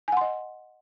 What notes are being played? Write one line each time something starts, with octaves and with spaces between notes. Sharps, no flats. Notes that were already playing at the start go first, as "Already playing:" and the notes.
D#5 F#5 G#5 C6